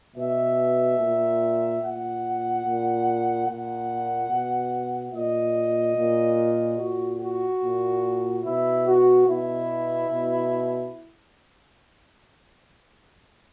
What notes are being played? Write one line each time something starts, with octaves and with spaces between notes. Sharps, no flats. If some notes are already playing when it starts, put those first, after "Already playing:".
B2 E5
A#2
A#2 F#5
A#2
A#2 F#5
B2
A#2 D#5
A#2
A#2 F#4
F#4
A#2
B2 E4
F#4
B2 E4
B2